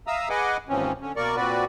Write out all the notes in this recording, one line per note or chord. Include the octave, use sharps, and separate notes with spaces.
E5 F5 A#5 D#6 E6
G#4 B4 D#5 F#5 G#5 D6
D#2 G#2 E3 F3 C4 C#4
D3 C#4
B2 A#3 A#4 D5 C#6
A#2 C4 F#4 B4 D5